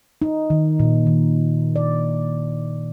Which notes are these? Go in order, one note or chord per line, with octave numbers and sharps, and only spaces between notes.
D#4
D#3
A#2
D#3
D5